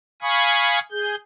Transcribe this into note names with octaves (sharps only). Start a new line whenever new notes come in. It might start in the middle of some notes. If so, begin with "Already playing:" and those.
F5 G#5 B5 C#6 D#6
G#4 G6